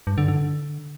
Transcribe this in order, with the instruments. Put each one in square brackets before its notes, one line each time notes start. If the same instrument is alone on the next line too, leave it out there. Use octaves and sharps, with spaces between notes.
[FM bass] G2
D3
D3